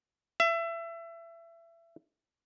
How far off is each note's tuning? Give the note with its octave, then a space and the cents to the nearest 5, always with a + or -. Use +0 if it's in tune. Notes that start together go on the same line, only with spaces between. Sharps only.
E5 +25